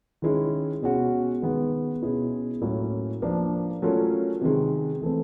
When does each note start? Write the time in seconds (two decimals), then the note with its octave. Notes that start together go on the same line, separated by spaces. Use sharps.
0.22 D#3 G#3 C#4 E4
0.82 B2 G#3 C#4 F#4
1.42 D#3 G#3 B3
2.02 B2 G#3 C#4 E4 G#4
2.62 A2 F#3 A#3 C#4 E4
3.22 F3 A#3 D4
3.82 F#3 A3 C#4 F4 A#4
4.41 C3 D#3 G#3
5.02 E3 A3 C4